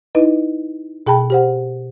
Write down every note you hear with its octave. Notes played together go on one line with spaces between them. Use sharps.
D#4 E4 B4 D#5
B2 G#4 G5 A5 B5
G4 C5 F#5